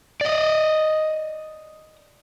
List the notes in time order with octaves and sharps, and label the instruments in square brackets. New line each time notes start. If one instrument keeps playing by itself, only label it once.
[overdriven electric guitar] D5 D#5